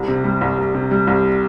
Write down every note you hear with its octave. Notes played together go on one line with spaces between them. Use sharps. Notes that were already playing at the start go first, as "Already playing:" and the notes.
Already playing: C2
C3
G3
C2
C2
C3
G3
C2